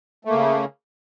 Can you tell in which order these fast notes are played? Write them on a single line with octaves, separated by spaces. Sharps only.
A3 A#3 C#3